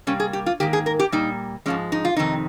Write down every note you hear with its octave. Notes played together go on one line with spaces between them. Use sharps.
C3 G3 A#3 C#4
G#4
G4
F4
G#2 D#3 A#3 G4
G#4
A#4
G4
A#2 G3 A#3 D#4
G#2 F3 G#3 C#4
D#4
F4
F2 C3 D#3 D#4